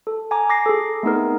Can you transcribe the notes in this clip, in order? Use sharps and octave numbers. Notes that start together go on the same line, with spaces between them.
A4
G#5 A#5 D6
D6 A#6 C7
G#4 A4
A3 B3 C4 D#4 G#4 A#4